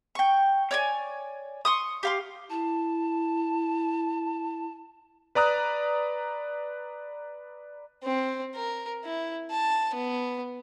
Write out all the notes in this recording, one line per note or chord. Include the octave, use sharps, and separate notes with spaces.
G5 C#6
C#5 D5 G#5
C6 C#6 D#6
G4 F5 C6
E4 A5
B4 D5 A#5 D#6 F#6
C4
A#4
E4
A5
B3